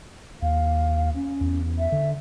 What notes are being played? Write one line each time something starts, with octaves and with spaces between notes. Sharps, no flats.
D#2 F5
C#4
E2
E5
D3